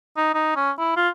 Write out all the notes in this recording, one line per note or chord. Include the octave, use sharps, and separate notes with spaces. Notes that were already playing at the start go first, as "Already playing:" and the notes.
D#4
D#4
C#4
E4
F4